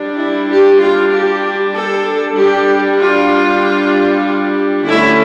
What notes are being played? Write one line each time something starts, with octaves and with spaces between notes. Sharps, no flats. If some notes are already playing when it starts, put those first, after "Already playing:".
Already playing: G3 D4
E4
G4
F4
G4
A4
G3 D4 G4
F4
D3 A3 C#4 E4